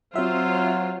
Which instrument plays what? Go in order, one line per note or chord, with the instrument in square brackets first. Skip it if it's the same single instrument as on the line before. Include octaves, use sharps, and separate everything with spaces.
[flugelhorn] F#3 [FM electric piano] C4 E5 [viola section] F4 C5